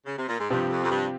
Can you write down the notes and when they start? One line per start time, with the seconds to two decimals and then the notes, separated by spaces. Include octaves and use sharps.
0.06 C#3
0.17 C3
0.28 A#2
0.39 G#2
0.50 G2 C3 F3 C4 G4
0.70 F2
0.83 F2
0.90 G2